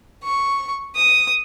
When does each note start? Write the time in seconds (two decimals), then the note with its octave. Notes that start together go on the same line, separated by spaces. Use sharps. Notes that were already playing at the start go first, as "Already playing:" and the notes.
0.24 C#6
0.96 D#6